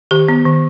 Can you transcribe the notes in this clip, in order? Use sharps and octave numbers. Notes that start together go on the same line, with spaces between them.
D#3 G4
B3
D#3